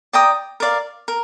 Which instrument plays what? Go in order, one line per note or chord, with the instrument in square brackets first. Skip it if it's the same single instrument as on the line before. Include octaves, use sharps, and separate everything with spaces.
[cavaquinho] D5 G5 A#5 D#6
A#4 D5 F5
A#4